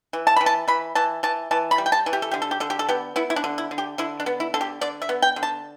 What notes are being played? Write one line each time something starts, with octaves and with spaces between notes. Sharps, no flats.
E3
A5
E3 B5
A5
E3 B5
E3 A5
E3 A5
E3 A5
B5
G3
G5
A5
E3
G4
A4
D3 G4
A4
G4
D3 A4
G4
A4
B3 G4
B3 E4
E4
D4
D3
E4
D3
G4
D3 E4
D4
B3
E4
D3 A4
G4
D3 D5
E5
B3
G5
D3
A5